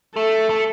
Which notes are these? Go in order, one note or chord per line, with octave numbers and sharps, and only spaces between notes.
A3 A4
A3